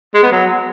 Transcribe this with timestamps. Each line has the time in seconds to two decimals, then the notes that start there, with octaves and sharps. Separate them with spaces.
0.14 G#3
0.23 B3
0.32 F#3